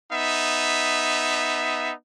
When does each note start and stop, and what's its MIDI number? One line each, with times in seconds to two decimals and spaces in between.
0.13 1.92 59
0.13 1.92 63
0.13 1.92 76